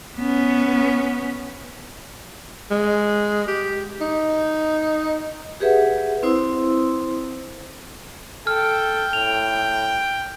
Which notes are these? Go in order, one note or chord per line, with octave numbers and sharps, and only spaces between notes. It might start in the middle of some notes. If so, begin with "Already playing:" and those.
B3 C#4
G#3
G4
D#4
G4 G#4 B4 E5 F#5
C4 E4 C5 C6 D#6 E6
A4 G5 F6
A2 F7